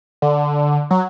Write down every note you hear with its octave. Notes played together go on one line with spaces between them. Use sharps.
D3
F#3